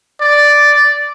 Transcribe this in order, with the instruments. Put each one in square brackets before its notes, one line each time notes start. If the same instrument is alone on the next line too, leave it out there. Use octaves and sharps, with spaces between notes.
[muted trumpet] D5